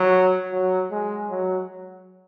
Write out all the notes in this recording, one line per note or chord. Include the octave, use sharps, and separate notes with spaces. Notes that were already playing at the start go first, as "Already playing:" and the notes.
Already playing: F#3
F#3
G#3
F#3